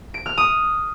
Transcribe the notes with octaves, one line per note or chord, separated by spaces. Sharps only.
D7
F6
D#6